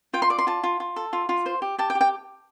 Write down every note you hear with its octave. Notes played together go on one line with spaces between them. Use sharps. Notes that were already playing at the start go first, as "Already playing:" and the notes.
F4 G5
C6
D5 D6
C6
F4 A5
F4
F4
A4
F4
F4
C5
G4
G4 A5
G5
G4
G5